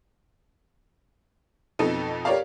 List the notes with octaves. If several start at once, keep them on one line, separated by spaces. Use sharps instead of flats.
F2 B2 B3 D#4 A4
G4 A#4 C#5 D5 F5